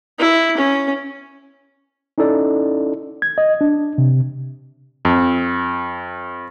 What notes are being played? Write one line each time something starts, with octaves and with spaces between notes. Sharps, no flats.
E4
C#4
C#4 D#4 E4 A4 D5
G#6
D#5
D4
C3
F2